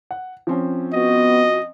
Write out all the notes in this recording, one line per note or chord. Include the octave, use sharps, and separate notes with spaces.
F#5
F3 C4 C#4
B3 F#4 D#5